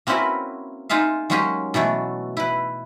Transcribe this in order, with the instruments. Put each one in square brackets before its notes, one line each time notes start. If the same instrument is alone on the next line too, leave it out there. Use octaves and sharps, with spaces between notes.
[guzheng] A#3 C4 C#4 E4 F#4 B4
D#4 F4 G#4 E5 F5
F#3 G#3 A#3 C#4 G4 G#4
B2 E3 F#3 A3
E4 B4